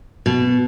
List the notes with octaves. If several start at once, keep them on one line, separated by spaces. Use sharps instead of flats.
B2